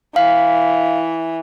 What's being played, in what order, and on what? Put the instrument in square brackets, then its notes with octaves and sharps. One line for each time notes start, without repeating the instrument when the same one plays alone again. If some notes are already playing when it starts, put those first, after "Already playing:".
[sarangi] E3 [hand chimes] F5